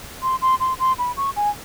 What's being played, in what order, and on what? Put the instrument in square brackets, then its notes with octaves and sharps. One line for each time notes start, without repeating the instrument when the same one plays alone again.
[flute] C6
C6
C6
C6
B5
C#6
G#5